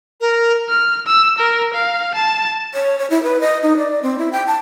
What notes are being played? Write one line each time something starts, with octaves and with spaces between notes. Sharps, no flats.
A#4
F6
E6
A#4
F5
A5
C#5
C#5
E4
B4
D#5
D#4
D5
C4
E4
G5
A5